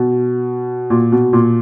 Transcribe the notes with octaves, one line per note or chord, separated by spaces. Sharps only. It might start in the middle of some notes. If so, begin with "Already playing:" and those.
Already playing: B2
A#2
B2
A#2